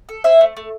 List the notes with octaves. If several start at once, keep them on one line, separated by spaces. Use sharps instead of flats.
A4
E4 C5 E5
A3
A3